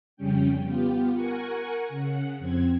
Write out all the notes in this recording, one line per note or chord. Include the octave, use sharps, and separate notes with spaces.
F2 C#3 G3 C#4 G5
B3 F4 G4
A#4 F#5 G#5 C#6
C#3 F#5
F2 C4 G#6